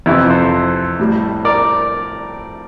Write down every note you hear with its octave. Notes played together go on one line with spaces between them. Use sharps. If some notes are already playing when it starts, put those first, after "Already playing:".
F2 C3 E3 E4
A4 C5
A2 G3
A#4 D5